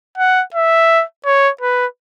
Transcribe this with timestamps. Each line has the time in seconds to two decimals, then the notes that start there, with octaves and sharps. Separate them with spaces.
0.18 F#5
0.54 E5
1.25 C#5
1.61 B4